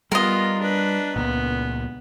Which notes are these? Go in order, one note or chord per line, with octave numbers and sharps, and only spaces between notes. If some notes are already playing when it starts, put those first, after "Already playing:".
G3 B3 F4 A#4 D#5
D4 B4
C#2 A#2 B3